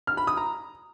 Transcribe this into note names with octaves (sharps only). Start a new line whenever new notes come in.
F6
B5
D#6
A#5